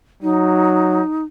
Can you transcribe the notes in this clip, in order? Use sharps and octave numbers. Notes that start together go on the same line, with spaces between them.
F#3 D#4